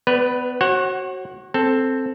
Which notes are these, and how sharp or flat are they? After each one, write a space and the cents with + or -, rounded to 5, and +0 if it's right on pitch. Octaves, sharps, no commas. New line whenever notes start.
B3 +30 B4 +0 D5 +0
F#4 +20 C#5 -45 F#5 +0
C4 +0 A4 +0